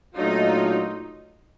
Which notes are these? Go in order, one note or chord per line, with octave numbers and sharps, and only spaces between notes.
A#2 F#3 A3 D4 D#4 F4